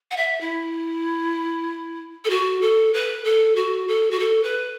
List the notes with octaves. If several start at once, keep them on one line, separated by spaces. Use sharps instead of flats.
F#5
E5
E4
A4
F#4
A4
B4
A4
F#4
A4
F#4
A4
B4